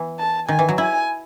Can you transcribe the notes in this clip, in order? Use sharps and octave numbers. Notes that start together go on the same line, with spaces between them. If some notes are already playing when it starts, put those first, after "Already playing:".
Already playing: E3 B3
A5
D#3 G#5
E3
F#3
E4 G#5